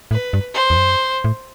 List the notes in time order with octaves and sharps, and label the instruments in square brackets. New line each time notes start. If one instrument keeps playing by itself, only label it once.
[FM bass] A2 [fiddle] B4
[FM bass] G2
[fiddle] C5
[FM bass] E2
F#2
A2